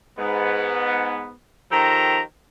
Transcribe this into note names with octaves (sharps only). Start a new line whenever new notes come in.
G#2 B3
D#3 F3 G4 A4 A#5